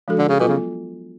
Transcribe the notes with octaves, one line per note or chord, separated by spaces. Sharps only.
F3 G#3 D4 F#4 A4
D3
C#3
B2 F#3 B3 F4 A4
C#3